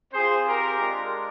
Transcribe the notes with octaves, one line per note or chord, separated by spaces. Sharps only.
C4 F4 G#4 C5
G4 A#4
G#3 D4 F4